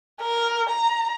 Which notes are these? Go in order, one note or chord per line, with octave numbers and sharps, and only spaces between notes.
A#4
A#5